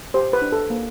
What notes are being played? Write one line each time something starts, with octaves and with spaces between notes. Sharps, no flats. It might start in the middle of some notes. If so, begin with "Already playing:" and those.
G4 C5
B4
D4
A4
A#3